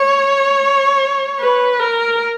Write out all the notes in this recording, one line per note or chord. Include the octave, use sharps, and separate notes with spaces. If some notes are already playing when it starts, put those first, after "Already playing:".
Already playing: C#5
B4
A#4